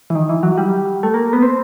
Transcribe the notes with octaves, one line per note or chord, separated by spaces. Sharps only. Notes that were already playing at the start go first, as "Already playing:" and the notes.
E3
D#3
E3
F#3
G3
A3
A#3
B3
C4